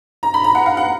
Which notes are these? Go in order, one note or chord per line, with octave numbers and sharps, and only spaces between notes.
A#5
B5
A#5
F#5
F5
F#5